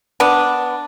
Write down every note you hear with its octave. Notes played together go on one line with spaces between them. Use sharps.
B3 D4